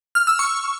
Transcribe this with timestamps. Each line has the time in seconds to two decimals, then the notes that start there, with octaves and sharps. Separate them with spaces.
0.15 F6
0.27 E6
0.39 C#6